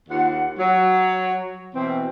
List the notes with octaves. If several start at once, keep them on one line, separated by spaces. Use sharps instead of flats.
D#2 F4 F#5
F#3
B2 E3 C4